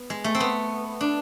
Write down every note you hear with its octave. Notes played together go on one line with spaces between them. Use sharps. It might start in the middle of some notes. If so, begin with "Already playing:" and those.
Already playing: B3
G#3
A3
C4
B3
D4